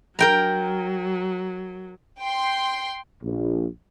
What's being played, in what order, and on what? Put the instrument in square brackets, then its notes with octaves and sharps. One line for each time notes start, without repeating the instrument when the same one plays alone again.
[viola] F#3 [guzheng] A#4 G5 A#5
[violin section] G5 C6
[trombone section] A#1